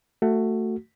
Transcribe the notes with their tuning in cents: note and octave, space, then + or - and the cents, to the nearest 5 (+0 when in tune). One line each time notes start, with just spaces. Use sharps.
A3 +15 F#4 +0